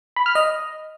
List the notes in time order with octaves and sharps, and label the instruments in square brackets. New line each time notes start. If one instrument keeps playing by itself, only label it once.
[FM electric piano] B5
F6
D#5